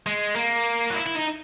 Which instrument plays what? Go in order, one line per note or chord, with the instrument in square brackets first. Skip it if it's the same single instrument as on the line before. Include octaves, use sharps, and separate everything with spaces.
[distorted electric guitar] G#3
A#3
F#4
E4
E4
D#4